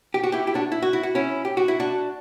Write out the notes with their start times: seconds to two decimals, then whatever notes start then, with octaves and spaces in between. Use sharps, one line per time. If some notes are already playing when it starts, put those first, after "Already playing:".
0.14 G4
0.24 F#4
0.32 E4 G4
0.47 E4 G4
0.55 D4 F#4
0.72 E4
0.82 F#4
0.93 E4
1.03 F#4
1.15 C#4 E4
1.45 G4
1.57 F#4
1.68 E4
1.80 D4 F#4